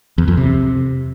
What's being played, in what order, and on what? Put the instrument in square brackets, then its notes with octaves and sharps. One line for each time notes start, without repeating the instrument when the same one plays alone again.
[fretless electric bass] E2
F2
C3